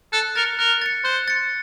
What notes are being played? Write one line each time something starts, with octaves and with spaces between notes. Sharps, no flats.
A4 F#6
A#4 A6 C#7
A#4 F#6
A6 C#7
C5 F#6
A6 C#7